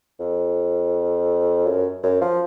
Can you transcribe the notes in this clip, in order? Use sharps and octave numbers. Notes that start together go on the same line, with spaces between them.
F2
F#2
F#2
F3